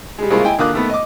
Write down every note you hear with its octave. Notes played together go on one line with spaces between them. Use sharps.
G3 G#3
C2 C#3 G#3 A#3 F4 B5
E4 D#5 G5 G#5
D3 A#3 F4 D6 D#6 F#6
D#3 A3 B3
D#5 D6